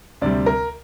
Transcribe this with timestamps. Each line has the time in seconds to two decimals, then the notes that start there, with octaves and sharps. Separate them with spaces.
0.21 D2 C3 G3 D5
0.46 A#4